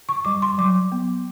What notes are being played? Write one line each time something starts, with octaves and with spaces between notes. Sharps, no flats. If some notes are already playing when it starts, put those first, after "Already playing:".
C#6
G3 D6
C6
F#3 D6
B3